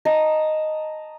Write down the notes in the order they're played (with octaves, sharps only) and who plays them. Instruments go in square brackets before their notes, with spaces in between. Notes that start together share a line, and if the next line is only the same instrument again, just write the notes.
[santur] D#5 A5 A#5